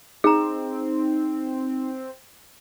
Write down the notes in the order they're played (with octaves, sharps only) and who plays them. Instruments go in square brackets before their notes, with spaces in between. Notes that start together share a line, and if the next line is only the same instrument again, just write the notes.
[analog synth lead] C4 [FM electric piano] D#4 [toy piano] G#4 A#5